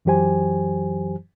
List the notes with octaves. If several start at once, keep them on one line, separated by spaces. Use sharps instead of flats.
F#2 E3 F#3 G4 C5 G#5